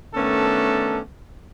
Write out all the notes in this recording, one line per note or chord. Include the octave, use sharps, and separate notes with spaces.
D#3 A3 B3 C#4 D4 A4